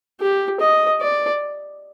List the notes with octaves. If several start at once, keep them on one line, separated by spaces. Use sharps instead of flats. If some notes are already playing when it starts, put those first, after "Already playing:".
G4
D#5
D5